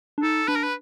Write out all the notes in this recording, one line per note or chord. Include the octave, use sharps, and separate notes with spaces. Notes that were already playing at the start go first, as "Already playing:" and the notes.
D4
D#4 A4
D4 B4
A#4
B4